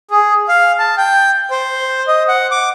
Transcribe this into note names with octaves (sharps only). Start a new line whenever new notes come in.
G#4
F5
A5
G5
C5
D#5
F#5
D6